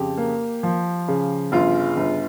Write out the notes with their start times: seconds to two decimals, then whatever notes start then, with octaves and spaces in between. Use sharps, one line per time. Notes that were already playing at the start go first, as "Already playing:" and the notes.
Already playing: F2 C#3 G4
0.18 A#3
0.63 F3
1.08 C#3
1.52 G1 F4
1.97 G1